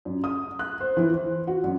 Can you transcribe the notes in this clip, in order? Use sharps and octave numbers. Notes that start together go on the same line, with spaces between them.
F#2
D#6
F#6
C5
E3
C5
F#4
F#2